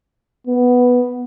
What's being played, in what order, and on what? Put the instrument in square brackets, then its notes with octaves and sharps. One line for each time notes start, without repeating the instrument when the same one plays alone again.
[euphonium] B3